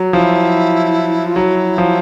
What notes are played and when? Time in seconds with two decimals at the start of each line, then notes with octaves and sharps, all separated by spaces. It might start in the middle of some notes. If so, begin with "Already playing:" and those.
Already playing: F#3
0.13 F3 E4
1.26 F4
1.36 F#3 E4
1.78 F3